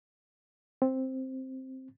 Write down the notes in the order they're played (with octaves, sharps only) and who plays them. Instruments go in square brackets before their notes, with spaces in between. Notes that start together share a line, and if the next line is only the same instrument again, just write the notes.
[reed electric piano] C4